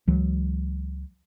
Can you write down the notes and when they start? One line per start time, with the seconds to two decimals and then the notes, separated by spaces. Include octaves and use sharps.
0.07 C#2 E3 F#3